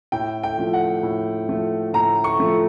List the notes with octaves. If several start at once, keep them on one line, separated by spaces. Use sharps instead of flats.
A2 G5
G5
F3 A3
F#5
A2
F3 A3
A2 A#5
C#6
F3 A3